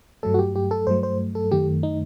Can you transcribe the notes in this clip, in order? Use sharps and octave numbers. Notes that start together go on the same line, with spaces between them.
G2 F#3 A3 A4
F#4
G4
G4
A4
G2 F#3 A3 C5
C5
A4
F#2 D#3 A3 G4
D#4